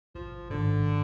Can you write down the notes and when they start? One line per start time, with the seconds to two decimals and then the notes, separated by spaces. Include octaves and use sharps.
0.15 G#1 F3
0.50 G#2 D3 D#3